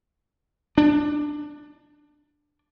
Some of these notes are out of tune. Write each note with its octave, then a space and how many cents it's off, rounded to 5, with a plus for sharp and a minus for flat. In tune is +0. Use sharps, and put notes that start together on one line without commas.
D4 +10